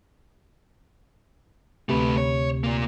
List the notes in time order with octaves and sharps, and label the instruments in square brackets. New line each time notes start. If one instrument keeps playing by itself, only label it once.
[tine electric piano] D2 C3 [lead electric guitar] A3 B4
[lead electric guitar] C#5
A#2 A#3